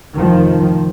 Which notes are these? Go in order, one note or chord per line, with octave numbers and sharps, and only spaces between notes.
F1 D#3 F3